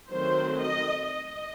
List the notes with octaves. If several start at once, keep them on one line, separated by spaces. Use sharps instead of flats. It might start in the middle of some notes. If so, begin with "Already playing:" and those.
D#3 F#3 A3 C4 C5
D#5
D#5